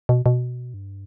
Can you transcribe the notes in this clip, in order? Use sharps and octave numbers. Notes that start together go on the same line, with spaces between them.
B2
B2
G2